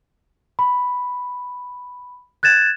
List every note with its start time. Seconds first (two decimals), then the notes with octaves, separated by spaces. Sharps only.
0.59 B5
2.43 F#6 G#6 A6 E7